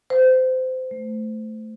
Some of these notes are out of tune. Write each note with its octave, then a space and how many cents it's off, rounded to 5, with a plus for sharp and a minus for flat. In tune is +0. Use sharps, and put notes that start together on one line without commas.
C5 -25
A3 +0